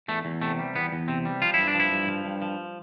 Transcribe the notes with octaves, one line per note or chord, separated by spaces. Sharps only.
E2 A3
E2
C3 A3
G3
E2 B3
E2
C3 C4
G3
F3 F4
G2 E4
D4
F3 E4
G2
F3
G2
F3